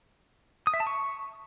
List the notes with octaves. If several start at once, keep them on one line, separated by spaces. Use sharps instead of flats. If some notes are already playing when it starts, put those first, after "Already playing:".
D#6
E5
A5
C#6